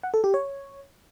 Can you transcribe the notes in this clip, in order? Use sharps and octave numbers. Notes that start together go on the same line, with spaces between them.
F#5
A4
G4
C#5